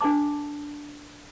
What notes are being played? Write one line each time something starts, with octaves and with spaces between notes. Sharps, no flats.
D4 A4 E5 A5 D6